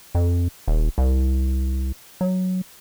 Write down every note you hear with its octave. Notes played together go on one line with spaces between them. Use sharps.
F2
D#1
C2
F#3